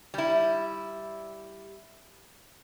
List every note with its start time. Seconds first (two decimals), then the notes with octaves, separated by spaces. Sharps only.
0.14 G3 E4